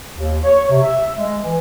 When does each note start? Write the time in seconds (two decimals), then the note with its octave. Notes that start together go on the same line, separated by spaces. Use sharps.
0.16 D#2
0.44 C#5
0.70 C3
0.82 E5
1.17 G#3
1.41 E3